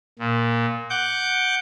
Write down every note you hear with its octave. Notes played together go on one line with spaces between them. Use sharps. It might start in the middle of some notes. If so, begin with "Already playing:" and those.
A#2
F#5 D6 G6